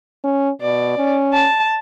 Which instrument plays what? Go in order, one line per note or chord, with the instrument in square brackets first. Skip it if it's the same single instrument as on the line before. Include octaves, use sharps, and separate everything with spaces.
[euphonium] C#4
[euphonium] B2 [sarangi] D5
[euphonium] C#4
[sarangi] A5